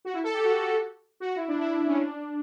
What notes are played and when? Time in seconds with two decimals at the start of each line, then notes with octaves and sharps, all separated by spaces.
0.05 F#4
0.14 E4
0.24 A4
0.34 G4
0.44 F#4
1.20 F#4
1.36 E4
1.48 D4
1.61 E4
1.87 C#4
1.97 D4